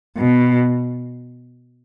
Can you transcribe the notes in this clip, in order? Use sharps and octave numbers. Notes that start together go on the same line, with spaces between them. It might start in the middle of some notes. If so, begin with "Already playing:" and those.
B2